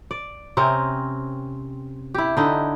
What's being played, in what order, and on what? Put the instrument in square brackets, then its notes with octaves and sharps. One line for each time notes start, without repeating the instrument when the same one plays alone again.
[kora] D5
C3 C4 C#4 A#4
E4 G4
D3 D#4 E4